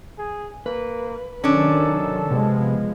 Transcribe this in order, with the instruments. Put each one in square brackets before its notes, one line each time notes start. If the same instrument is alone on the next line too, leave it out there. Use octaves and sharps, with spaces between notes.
[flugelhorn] G#4
[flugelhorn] A#3 [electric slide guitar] B4
[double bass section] C3 D#3 F#3 [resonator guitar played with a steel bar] C#4 D4 [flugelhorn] A4
[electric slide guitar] C3 [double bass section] F3 G#3 B3